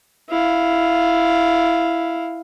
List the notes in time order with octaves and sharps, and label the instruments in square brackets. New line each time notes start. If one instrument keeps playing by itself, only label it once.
[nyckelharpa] E4 F5